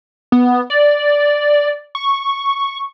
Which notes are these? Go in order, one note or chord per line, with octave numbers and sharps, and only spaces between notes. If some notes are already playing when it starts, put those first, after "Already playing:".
B3
D5
C#6